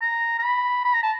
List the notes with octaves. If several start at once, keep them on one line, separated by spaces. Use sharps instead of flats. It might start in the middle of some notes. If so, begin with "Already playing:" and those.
A#5
A#5
B5
B5
A#5
A5